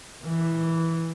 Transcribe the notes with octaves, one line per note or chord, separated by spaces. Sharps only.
E3